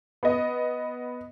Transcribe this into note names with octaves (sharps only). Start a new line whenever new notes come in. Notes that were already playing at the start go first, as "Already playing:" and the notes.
B3 D#5